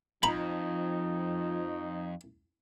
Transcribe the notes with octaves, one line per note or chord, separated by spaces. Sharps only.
F2 F3 D#4 A#5 B5